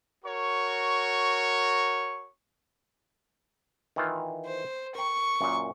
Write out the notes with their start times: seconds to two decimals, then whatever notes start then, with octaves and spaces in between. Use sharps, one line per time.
0.25 F#4 A#4 C#5 C#6
3.96 D#3 E3 F4
4.45 C5
4.95 A#4 G5 C#6
5.41 F#2 A#2